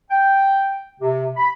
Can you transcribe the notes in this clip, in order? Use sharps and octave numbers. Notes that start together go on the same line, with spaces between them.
G5
C3
B5